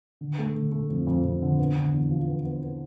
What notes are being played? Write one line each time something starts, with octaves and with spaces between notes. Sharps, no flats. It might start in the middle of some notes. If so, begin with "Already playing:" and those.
D3
A3
D3
A3
F2
F2
F2
D3
B3
D3
E2
F3
B3
B3
B3